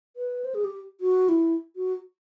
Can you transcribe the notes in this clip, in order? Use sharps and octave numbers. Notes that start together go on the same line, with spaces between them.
B4
C5
G#4
G4
F#4
E4
F#4